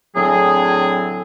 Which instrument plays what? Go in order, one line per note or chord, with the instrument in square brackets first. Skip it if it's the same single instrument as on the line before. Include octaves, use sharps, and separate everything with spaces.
[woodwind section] A2 D3 F#3 C4 G#4